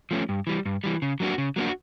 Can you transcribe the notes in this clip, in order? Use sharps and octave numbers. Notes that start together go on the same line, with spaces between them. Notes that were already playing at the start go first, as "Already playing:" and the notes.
F3 A3 C#4
G2
E3 G3
G2
E3 G3
C#3
F#3 A#3 D4 F#4
C#3
F#3 A#3 D4 F#4